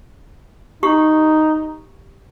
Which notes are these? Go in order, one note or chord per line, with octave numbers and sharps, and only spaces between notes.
D#4 G4 C#6